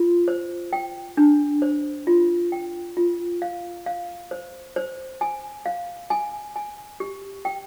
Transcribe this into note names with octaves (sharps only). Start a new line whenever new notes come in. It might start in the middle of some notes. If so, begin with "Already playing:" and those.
Already playing: F4
C5
G5
D4
C5
F4
G5
F4
F5
F5
C5
C5
G#5
F5
G#5
G#5
G4
G5